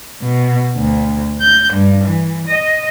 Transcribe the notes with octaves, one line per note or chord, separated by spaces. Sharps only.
B2
D2
G6
G2
E3
D#5